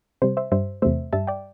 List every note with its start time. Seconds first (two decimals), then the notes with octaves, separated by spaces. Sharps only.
0.22 C3 G3 C5
0.37 C5 E5
0.52 G2 G3 C5 E5
0.82 E2 C3 A3 C5 E5
1.13 G2 G3 E5 A5
1.27 D5 G5